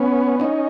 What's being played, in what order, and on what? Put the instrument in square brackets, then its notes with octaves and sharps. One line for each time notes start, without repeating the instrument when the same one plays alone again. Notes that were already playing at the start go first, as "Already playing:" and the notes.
Already playing: [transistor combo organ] B3 C#4
C#4 D#4